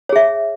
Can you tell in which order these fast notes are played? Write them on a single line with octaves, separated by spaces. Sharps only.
C#5 G#4 E5